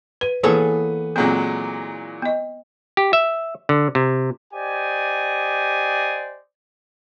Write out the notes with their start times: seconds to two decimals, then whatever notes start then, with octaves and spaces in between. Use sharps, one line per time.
0.21 B4 D#7
0.43 E3 A#3 B3 G#4 A4 C#5
1.16 A#2 F#3 G#3 B3 C4
2.22 B3 D#5
2.97 G4
3.13 E5
3.69 D3
3.95 C3
4.54 G4 C5 D5 D#5 G#5